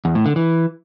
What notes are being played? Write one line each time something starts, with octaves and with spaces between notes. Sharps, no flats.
E2
A2
D3
E3